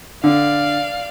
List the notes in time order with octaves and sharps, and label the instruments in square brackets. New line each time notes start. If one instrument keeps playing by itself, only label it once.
[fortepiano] D3 [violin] D5 F5